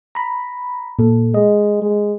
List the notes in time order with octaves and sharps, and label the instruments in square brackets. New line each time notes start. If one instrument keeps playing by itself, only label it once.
[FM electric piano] A#5 B5
A#2 A4
[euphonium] G#3 [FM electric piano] D#5
[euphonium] G#3